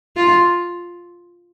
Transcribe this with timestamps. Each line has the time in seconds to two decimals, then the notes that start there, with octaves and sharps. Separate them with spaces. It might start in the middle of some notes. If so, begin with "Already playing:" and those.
0.16 F4